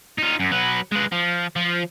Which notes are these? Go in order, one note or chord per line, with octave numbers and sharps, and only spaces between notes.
D#4 F4
F#2
F#3 B4
G#3 B4
F3
F3